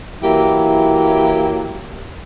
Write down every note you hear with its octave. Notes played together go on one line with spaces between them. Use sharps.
E3 F#3 A#3 E4 G4